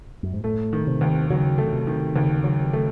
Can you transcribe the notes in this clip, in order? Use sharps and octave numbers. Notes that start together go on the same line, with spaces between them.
F#2
G#2
A2 A3
D#3
C3
D#2
C#3 F#3
A3
C#3
C3
D#3
D#2 C#3
F#3
A3